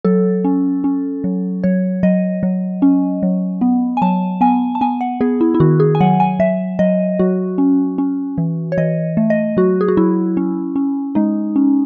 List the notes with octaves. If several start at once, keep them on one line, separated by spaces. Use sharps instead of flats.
F#3 A4
C#4
C#4
F#3
F#3 C#5
F#3 D#5
F#3
C#4
F#3
B3
G#5
F#3 A5
B3 G#5
A5
B3 G#5
F#5
B3 G#4
E4
E4
D#3 F#4
G#4
G#5
F#3 F#5
G#5
F#3 E5
F#3 D#5
F#3 F#4
C#4
C#4
E3
C#5
E3 D#5
A3
D#5
F#3 F#4
G#4
F#4
F#3 E4
C#4
C#4
G#3 D#4
C#4